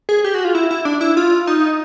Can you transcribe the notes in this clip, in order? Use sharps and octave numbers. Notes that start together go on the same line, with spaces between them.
G#4
G4
F#4
F4
E4
E4
D4
E4
F4
D#4